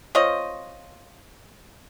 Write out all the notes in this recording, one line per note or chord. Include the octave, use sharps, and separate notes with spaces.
C4 F4 C#5 D#5